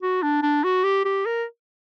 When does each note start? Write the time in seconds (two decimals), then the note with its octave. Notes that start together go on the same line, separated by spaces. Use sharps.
0.03 F#4
0.23 D4
0.43 D4
0.64 F#4
0.84 G4
1.05 G4
1.26 A#4